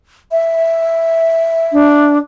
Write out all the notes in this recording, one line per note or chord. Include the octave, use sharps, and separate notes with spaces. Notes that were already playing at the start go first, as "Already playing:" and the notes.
E5
D4